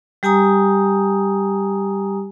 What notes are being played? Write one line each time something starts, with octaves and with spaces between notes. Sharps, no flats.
G3 G4 G#5 A#5 D#6